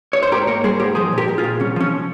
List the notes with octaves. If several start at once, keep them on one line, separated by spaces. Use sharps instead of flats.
C#5
C5
G#2 G4 A#4
A#3 A#4 C#5
G3 G#4 C5
G#2 G4 A#4
F3 G#4 C5
A#2
G4 A#4
A#2 G4
F4 G#4
A#2
C2 C#4
F3 C#4